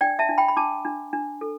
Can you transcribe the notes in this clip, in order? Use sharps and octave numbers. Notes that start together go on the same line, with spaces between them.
D4 D5 G5
E5 A5
D4
G5 B5
B5
D4 A5 D6
D4
D4
A4